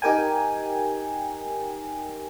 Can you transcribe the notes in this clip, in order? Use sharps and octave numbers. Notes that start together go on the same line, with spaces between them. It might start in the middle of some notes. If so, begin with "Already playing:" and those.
D#4 G4 A#4 G5 G#5